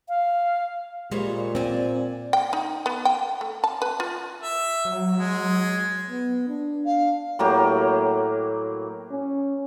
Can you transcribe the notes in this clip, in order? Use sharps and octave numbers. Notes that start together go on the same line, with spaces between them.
F5
A#2 G3 G#3 C5 C#5
C4 D5 G#5
G5
D#4
B3
G5
A3
A5
B4
F4
E5
F#3
G#3
B3
D4
F5
A2 F#3 A#3 G4
C#4